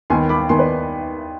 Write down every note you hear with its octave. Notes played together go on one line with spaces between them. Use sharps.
D#2 D#3 B3 G#5 C6
B5 D6
D#2 D#3 B3 G#5 C6
B4 D5